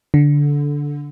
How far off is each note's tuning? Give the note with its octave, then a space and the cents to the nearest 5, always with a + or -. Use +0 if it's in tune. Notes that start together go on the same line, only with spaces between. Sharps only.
D3 -10